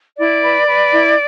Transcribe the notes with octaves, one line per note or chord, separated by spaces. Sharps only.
E4 D5
B4
B4
E4